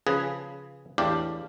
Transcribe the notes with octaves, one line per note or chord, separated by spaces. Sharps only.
C#3 F3 G#4 B4
E2 A2 D4 G4 F5